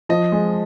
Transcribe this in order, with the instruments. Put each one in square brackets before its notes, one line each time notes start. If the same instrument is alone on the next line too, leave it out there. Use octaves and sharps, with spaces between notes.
[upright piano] F3 [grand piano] D#5
[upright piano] G#3